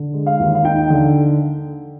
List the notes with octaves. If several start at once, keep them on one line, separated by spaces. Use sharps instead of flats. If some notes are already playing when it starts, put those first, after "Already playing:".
Already playing: D3
G#3
F5
D#2
F5
D#4 G5
D3